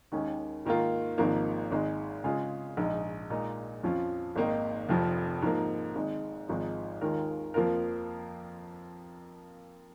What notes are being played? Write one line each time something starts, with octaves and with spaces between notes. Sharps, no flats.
D#2 D#3 G#3 C#4
G#2 D#3 A#3 F4
G#1 G#2 F3 A#3
G#1 G#2 G#3
C#3 G#3 F4 G#4
A#1 G#2 G#3 D#4
A#2 G#3 D#4
F2 F3 C#4 F4
G#1 G#2 D#3 A#3 D#4
F1 F2 F3
G#2 F3 A#3
G#1 G#2 G#3
G#1 G#2 F3 G#3 D#4
D#2 D#3 G#3 F4 A#4
F2 F3 A#3 F4 A#4